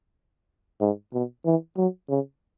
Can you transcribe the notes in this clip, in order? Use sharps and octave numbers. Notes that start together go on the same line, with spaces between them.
G#2
B2
E3
F#3
C#3